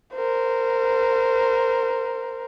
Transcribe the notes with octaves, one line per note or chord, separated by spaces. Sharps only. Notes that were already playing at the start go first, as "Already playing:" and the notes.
A#4 C5